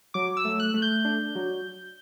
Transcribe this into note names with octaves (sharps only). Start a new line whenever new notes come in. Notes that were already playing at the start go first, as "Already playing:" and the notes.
F#3 D6
E6
A3
F#6
A3
G6
D4
F#3